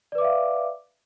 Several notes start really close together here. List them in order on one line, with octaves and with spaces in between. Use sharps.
D5 B4 D6 E5 F5